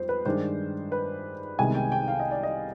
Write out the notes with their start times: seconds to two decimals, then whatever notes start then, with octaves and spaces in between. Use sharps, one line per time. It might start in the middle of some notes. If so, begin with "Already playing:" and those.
Already playing: F2 G3 C5
0.09 B4
0.25 G2 D#3 G#3 D4 C5
0.92 B4
1.59 C2 C3 D#3 G#3 B3 G#5
1.75 G5
1.92 G5
2.08 F5
2.20 D#5
2.31 D5
2.43 D#5